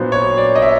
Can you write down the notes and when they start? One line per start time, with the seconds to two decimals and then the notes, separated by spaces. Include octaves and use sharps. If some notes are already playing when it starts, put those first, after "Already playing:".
Already playing: A#2 F#3 B3 D4 C5
0.12 C#5
0.38 D5
0.55 D#5
0.62 E5